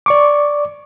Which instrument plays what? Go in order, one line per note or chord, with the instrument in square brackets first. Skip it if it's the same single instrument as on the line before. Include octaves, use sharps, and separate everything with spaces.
[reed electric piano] D5 C#6 D6